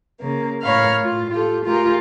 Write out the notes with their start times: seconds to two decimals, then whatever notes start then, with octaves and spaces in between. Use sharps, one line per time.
0.21 C#3 A#3
0.62 A2 A#4 C#5 F5 B5 F6
1.00 A2 F4
1.31 F4 G4 A4
1.65 A3 F4 G4 G#4 A#4